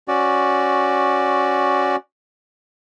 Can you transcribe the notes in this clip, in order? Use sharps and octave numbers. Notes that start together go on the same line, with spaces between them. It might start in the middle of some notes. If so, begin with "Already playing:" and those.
C#4 F#4 D5